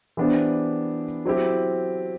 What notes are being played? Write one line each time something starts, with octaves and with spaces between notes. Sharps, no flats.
E3 B3 D4 G4 C5
F#3 C4 E4 G4